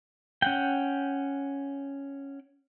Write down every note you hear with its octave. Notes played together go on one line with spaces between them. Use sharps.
C#4 F#5 G5